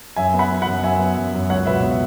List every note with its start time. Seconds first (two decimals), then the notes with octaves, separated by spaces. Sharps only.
0.16 F#2 E5 G#5
0.34 B3
0.39 F#5 B5
0.51 B3
0.62 F#2 F#5 B5
0.84 F#2 E5 G#5
1.00 B3
1.17 F#2
1.34 F#2
1.50 C#2 C#5 F#5
1.66 B2 B4 E5
1.83 B3
1.91 E5